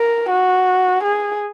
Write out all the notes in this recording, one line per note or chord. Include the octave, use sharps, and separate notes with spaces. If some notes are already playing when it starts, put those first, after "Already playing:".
Already playing: A#4
F#4
G#4